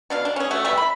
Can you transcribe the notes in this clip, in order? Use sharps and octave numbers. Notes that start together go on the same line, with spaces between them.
B2 D4 F5
D4
C#4 G#4
A3 F#4
E3 G3 A3 E5
B5